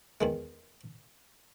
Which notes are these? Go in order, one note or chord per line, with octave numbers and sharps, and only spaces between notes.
E2 D#3 G#3